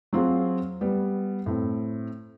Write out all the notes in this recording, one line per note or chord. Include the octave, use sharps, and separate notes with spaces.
F#3 C4 F4 F#4 G#4
G3 B3
A2 C4